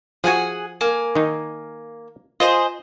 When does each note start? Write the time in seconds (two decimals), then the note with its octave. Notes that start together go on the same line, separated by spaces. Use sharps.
0.24 F3 F#4 G#4 F#5 G#5
0.81 A#3 G#5
1.15 D#3 D#4
2.40 F4 G#4 C5 D#5